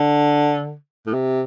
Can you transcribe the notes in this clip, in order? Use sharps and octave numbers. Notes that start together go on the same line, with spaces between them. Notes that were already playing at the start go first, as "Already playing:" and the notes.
Already playing: D3
A2
C3